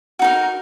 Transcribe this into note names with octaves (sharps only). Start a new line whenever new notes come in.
D#4 F#4 A#4